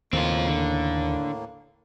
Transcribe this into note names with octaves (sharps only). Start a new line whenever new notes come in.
D#2 A2 C#3 A#3 C4 F4
D3